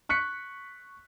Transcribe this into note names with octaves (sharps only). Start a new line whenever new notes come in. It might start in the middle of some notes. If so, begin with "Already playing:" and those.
C#6 F#6 B6 C#7